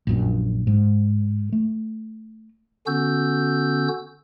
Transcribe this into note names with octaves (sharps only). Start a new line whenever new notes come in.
A#1 F#2 A#2
G#2
A3
D3 B3 C#4 F#4 E6 G6